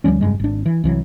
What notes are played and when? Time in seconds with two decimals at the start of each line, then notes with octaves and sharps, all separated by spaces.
0.04 D2 F3 G3 C#4
0.21 F1 G2 G#3
0.40 G#1 D4
0.66 E3
0.84 C2 E3 F#3